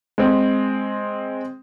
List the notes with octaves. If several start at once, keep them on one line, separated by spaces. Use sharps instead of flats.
G#3 C4